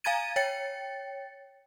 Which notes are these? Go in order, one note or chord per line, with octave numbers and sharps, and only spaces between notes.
F5 G#5 A#5 G#6 A6 D#7
C#5 G5 A6 C#7